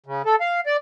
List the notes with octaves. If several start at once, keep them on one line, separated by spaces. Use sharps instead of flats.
C#3
A4
F5
D5